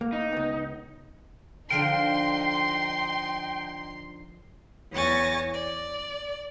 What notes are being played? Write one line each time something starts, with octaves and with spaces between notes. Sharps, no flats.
A#3
D#4
C#2 B3
D3 F3 D#4 A#4 G5 C6
E2 C#5 G#5 C#6 A6 A#6
D5